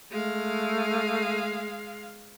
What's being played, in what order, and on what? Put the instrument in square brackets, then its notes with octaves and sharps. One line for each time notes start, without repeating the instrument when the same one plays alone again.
[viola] G#3 F5 [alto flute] A3